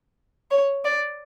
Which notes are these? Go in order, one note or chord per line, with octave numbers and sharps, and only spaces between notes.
C#5
D5